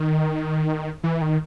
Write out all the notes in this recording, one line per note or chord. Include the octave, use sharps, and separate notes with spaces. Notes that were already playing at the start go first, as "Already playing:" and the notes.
Already playing: D#3
E3
D#3